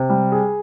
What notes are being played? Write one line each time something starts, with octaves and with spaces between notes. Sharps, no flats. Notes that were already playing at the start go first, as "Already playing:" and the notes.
Already playing: C3
G3
G#4